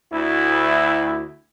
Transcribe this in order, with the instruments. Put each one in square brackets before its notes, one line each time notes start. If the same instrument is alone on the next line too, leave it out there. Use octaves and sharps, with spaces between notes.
[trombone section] D2 E4